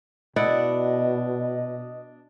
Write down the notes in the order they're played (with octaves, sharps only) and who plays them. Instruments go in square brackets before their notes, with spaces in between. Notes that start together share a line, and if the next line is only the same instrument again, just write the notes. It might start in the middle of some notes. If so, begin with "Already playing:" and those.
[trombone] B2 [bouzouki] D4 [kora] E4 D5 F#5 [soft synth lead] D#5